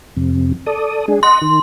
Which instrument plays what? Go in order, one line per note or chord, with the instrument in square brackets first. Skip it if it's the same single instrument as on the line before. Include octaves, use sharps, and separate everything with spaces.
[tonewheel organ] F2 C3
A4 D5 D#6
G#3 D4 G#4
[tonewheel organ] D#5 F#5 [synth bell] C6
[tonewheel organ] D#3